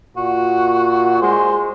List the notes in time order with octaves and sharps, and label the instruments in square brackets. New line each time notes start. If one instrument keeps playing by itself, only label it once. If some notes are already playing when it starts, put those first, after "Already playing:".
[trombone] A#2 [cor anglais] F#4
[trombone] G#3 [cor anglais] C5